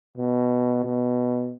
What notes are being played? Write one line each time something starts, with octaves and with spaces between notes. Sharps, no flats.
B2
B2